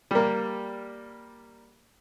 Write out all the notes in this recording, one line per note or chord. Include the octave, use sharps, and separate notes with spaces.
G3 A#3